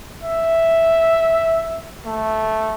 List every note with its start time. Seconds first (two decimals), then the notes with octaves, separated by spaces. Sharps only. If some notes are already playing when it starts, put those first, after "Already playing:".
0.24 E5
2.06 A3